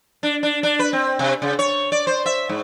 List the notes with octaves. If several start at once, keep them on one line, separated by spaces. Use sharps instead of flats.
D4
D4
D4
B4
C4
C3
C#3
C#5
D5
C5
E5
G#2